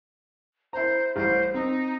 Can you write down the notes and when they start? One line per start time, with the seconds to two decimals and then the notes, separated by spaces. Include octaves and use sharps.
0.73 E4 C5 A#5
1.16 A1 G3 C5
1.54 C4 D#4